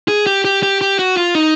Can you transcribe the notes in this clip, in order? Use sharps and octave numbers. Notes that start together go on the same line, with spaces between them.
G#4
G4
G4
G4
G4
F#4
F4
D#4